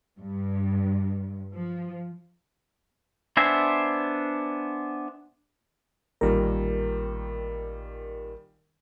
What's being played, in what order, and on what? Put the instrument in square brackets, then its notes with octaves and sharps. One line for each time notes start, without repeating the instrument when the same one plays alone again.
[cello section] G2
F3
[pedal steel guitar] B3 D4 C5 E5 G#5
[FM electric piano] A1 A#4 [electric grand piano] A#2 D#3 G3